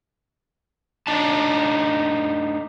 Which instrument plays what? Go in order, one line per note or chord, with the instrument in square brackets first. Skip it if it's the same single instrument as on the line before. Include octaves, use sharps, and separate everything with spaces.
[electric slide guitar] A3 D4 D#4 A5